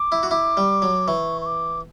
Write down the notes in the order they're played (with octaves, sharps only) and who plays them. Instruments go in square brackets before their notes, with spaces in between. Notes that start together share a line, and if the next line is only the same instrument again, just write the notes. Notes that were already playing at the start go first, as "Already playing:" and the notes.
Already playing: [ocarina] D6
[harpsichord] E4
F#4
[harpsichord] E4 [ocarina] D6
[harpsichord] G3
F#3
[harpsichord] E3 [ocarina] C#6
[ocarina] C#6
D6